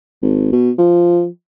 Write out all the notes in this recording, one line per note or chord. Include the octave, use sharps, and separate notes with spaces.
G#1
B2
F3